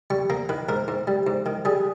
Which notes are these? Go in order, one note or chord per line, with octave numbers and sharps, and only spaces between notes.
G3 C#6
A#3 A#5
D#3 B4
G#2 A#4
G#2
G3
G#2
D#3
G3 G#4